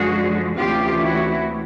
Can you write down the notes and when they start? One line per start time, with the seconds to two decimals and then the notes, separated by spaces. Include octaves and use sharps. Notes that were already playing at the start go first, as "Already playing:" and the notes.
Already playing: F#2 D3 F3 G#3 F#4 G#4
0.56 D2 C3 E3 A3 C#4 F4 G4
1.02 E4 F#4